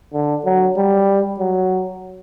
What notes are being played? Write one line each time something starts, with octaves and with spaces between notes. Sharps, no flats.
D3
F#3
G3
F#3